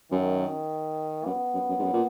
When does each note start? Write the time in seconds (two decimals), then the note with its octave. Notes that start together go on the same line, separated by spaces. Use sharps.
0.11 F#2 D#3
1.26 F#2 B3
1.54 F#2
1.69 F#2
1.79 G#2
1.83 F#2
1.93 A#2